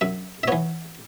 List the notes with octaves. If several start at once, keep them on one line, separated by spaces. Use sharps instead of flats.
F#2 E5
E5
E3 B3 C#5